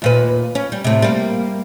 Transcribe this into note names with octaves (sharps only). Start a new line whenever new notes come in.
D#2 A#2 B4
C#4
G3
A2 C3
G3 A#3